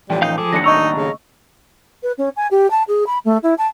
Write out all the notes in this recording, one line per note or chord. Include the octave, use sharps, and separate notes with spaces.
A2 E3 F3 G3 G5
D#4 F5 G6
F3 G#4 A4 D6
D#2 A2 D4 A#6 C#7
D#4 D#5 A#5 C#6 E6
C#3
B4
C#4
G#5
G4
A5
G#4
B5
A3
E4
A5